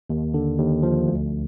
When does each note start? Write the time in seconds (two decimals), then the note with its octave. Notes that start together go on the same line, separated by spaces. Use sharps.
0.10 D#2
0.34 D3
0.59 D#2
0.83 F3
1.08 D2